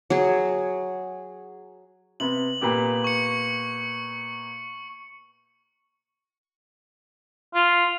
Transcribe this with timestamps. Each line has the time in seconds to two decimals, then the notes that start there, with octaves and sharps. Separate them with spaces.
0.10 F#3 G#4
2.20 C3 B3 F#7
2.61 A#2 B3 G4
3.04 C#6 C#7
7.55 F4